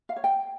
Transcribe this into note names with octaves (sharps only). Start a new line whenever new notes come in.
F5
C#5
G5